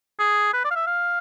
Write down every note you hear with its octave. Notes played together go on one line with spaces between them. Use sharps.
G#4
B4
D5
F5
E5
F5